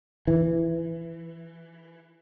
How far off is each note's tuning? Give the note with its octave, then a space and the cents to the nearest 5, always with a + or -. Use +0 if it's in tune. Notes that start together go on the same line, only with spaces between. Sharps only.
E3 +15